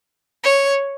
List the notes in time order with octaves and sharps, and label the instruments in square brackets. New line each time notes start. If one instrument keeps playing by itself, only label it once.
[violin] C#5